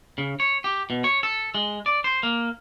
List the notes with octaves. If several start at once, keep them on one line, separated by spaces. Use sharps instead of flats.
C#3
C#5
G4
B2
C#5
A4
G#3
D5
C5
A#3